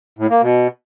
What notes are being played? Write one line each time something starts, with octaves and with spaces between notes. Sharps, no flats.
A2
A#3
B2